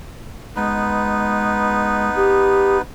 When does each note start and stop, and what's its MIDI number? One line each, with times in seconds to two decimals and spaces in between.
0.56 2.10 56
0.56 2.82 59
0.56 2.82 63
0.56 2.82 71
2.16 2.77 67